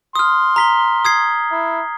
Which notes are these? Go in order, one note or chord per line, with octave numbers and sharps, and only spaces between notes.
C6 D#6 F6
A#5 B6 G7
D#6 G#6 C7
E4